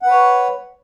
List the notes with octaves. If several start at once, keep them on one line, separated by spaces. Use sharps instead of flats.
B4 C#5 F#5